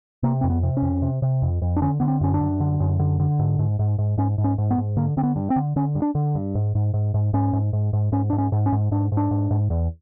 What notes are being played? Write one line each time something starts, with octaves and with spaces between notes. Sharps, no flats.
C3 A#3
F2 C4
B3
C3
C#4
F2
C3
C3
F2
F2
D4
D3 C#4
D3 B3
C4
F#2 C#4
D4
F#2
D3
F#2
D3
D3
G#2
G#2
G#2
G#2
G#2 C#4
G#2
C#4
G#2
B3
G#2
D3 A#3
D3 C4
B3
G2
C4
D3
D3 C#4
G2
D4
D3
G2
G#2
G#2
G#2
G#2
G#2 C#4
G#2
G#2
G#2
G#2 C#4
G#2 D4
C#4
G#2
C#4
G#2
G#2 D4
G#2
D4
G#2
G#2
E2